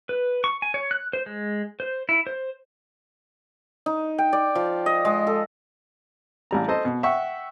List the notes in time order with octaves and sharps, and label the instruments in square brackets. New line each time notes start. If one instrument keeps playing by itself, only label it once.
[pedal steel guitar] B4
C#6
G#5
C#5
F#6
C5
G#3
C5
E4
C5
[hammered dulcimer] D#4
G5
D5
F3
D#5
G#3
A4
[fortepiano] A1 G3 A#5
A4 C5 D#5
B2
E5 F#5 G5 C#6